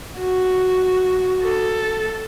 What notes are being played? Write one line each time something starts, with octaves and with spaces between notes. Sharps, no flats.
F#4
A4